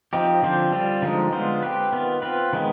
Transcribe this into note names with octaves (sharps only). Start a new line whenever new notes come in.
F3 C4 D#4 G4
D3 F3 C4 G4 C5
G3 C4 F4
D3 F3 G#3 C4 D#4
D3 G#3 B3 F4 C5
C4 G4 B4
D#3 B3 F4
C4 F4 B4
D#3 G#3 B3